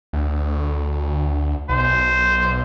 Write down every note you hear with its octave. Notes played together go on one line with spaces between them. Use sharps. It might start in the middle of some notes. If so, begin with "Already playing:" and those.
D2
B1 C5